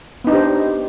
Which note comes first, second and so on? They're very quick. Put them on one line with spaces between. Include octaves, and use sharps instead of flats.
B3 D#4 D4 G4 C5